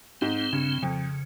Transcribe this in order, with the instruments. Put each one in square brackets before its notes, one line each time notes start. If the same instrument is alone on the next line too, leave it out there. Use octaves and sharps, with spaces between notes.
[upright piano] G#2 [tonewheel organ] C4
[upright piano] G2 [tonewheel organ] C#3
[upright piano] F2 [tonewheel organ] C#3